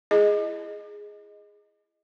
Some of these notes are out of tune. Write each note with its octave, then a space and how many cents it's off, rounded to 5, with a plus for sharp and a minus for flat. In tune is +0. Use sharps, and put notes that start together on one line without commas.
E4 +30 G#4 +0 D#5 +0